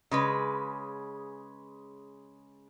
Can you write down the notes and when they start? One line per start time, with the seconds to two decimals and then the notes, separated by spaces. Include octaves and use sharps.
0.11 C#3 G#3 B4